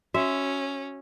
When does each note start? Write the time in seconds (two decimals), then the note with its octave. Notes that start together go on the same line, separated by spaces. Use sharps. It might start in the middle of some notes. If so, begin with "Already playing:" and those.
0.14 C#4 F#4 E5